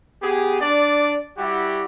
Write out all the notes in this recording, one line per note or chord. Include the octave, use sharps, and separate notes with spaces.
B3 G4 G#4
D4 D5
G3 E4 F#4 G4